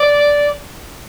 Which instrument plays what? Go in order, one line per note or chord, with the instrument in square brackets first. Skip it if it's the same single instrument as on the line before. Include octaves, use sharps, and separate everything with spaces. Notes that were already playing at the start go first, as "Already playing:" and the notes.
Already playing: [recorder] D5